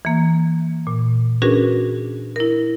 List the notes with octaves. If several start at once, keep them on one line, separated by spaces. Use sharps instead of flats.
E3 A#3
A#2
C#4 D4 F#4 G#4 A#4 B4
E4 A#4